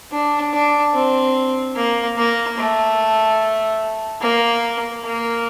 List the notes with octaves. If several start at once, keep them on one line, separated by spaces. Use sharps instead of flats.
D4
D4
C4
A#3
A#3
A3
A#3
A#3